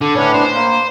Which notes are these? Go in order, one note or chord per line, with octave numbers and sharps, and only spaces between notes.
D3
A2 B3 C#4 D4
C5
A#3